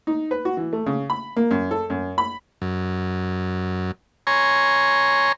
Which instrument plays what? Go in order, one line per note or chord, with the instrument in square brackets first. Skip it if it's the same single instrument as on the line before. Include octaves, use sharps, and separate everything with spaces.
[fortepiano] D#4
B4
F#4
E3
A3
C#3
B5
A#3
F#2
A4
F#2
B5
[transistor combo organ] F#2
C#5 G#5 A#5 C6 C#6